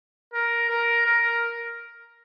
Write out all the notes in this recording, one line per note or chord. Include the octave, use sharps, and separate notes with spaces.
A#4
A#4
A#4